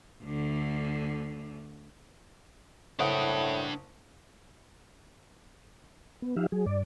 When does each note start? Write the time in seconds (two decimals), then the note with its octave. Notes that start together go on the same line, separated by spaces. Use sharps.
0.23 D2 D3
2.99 F#1 A2 D4 F#5 G5 D#6
6.22 B3
6.36 F3 D#4 G4 E5 F5
6.52 F#3 G#4
6.66 G2 D5